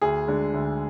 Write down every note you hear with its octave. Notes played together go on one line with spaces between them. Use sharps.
D2 G#4
D3 G#3
D2